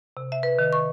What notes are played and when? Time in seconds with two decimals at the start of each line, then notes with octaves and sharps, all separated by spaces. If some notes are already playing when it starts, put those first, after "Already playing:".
0.17 C3
0.32 E5
0.43 B4
0.59 D#3
0.73 C#6